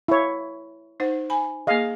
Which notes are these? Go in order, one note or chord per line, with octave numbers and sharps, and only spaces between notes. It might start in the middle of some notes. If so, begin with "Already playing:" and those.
E4 C#5
D#4 C5 F#5
G#5 B5
A#3 G#4 D#5 F5